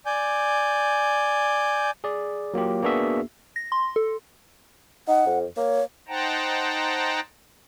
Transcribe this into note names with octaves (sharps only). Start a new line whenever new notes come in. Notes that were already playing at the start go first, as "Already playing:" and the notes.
D5 G#5 G6
G#4 D5
F#3 A#3 F4 G4
A#3 B3 D4 F#4 G#4 E5
A#6
C6
A4
D#4 F#5
F2
A#3 C#5
D#4 C5 F#5 G5 A5 A#5